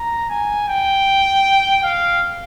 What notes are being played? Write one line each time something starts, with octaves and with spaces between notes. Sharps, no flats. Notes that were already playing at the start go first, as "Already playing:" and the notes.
Already playing: A#5
G#5
G5
F5